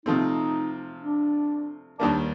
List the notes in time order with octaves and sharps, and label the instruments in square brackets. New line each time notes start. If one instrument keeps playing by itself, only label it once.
[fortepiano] C3 F3 A3 C4 [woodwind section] D#4
[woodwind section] D4
[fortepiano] D#2 D#3 G3 A#3 [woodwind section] D4